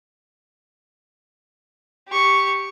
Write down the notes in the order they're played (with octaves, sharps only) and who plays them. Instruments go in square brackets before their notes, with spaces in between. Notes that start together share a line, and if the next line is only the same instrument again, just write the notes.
[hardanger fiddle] G4 C#6